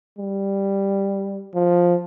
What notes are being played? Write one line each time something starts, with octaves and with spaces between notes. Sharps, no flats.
G3
F3